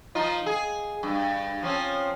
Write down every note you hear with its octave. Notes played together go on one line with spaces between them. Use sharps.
F3 D#4 F4
G#4
G2
F3 C4 C#4